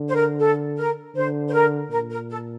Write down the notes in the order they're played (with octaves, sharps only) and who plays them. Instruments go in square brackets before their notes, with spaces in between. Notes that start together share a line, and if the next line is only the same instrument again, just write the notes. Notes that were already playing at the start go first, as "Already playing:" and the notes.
Already playing: [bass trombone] D3
[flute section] C5
A#4
A4
A#4
[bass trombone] D3 [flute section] C5
[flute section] C5
A#4
[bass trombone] A#2 [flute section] A#4
[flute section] A#4
A4